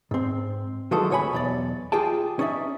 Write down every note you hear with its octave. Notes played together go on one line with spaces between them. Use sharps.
G#2 C4
D#3 E3 F#3 G#3 F#4 A4
D2 C3 C#5 G#5 B5
B1 E2 D5
F4 G4 G#4 G5 A5
C#4 D#4 D5 E5